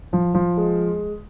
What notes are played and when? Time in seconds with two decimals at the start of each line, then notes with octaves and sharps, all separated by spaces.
0.13 F3
0.34 F3
0.57 G#3